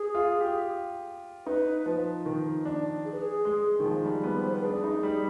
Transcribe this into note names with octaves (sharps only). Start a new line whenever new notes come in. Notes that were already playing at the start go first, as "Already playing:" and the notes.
Already playing: G#4
F4
G4
D#4 B4
F3
D#3
D4
G#4
B4
G#4
G#3
D#3
F3
G3
B3
C5
B4
D4 G#4
D#4
G3